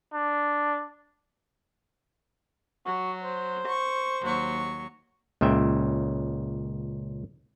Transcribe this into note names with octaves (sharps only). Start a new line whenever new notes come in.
D4
F#3 F#4
C5
C#6
D#2 F#3 C#6
C#2 A#2 C#3 E5 G5